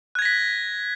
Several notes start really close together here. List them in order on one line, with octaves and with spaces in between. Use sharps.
F#6 G#6 A#6 B6